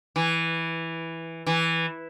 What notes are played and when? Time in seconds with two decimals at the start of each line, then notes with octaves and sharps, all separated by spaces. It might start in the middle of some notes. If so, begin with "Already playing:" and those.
0.16 E3
1.47 E3